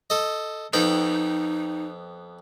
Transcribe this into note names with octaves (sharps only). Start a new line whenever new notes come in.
A4 D#5
F2 B3 D#4 G5